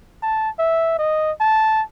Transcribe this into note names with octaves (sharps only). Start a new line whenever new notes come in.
A5
E5
D#5
A5